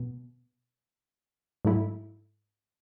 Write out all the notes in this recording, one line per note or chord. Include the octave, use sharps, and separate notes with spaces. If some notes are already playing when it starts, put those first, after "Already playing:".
Already playing: B2
G#2 F#3 A3 E4